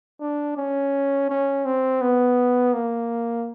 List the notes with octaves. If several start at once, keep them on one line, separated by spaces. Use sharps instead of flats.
D4
C#4
C#4
C4
B3
A#3